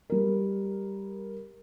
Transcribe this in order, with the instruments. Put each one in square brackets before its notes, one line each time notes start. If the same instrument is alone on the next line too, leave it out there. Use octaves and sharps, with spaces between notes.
[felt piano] G3 A#4